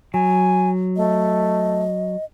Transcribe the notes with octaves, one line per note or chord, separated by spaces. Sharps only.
F#3 G#5
A3 D#5